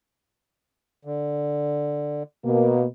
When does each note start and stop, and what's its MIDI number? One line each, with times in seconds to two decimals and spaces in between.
1.05 2.23 50
2.45 2.84 47
2.45 2.84 58